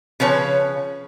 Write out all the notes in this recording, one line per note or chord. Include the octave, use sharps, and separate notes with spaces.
C#3 F3 B4 C#5